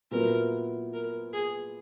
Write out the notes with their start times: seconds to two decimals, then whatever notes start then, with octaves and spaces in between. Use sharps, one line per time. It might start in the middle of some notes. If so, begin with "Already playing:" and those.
0.11 A#2 F#3 B3 E4 A#4 B4
0.94 A#4
1.33 G#4